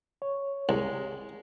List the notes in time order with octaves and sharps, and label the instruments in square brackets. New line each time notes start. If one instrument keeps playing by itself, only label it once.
[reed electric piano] C#5
[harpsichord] C2 [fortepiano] G#3